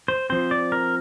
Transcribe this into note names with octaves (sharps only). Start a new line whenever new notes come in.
C5
F3 C4 C5
D5
A#4